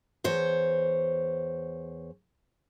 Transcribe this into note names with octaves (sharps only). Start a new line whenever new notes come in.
E2 C5 C#5